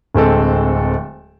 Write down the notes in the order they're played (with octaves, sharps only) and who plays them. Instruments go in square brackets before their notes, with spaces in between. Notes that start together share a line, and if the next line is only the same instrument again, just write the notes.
[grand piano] D1 G#3 C4 A4